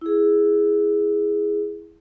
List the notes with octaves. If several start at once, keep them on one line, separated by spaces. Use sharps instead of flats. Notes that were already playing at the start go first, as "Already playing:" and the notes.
E4 G#4